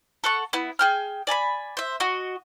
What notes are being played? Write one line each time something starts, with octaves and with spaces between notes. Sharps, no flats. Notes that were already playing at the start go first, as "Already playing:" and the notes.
A4 F#5 C#6
B3 E4
G#4 G5 F6
D5 G#5 A#5 B5
C5 E5
F#4 D#5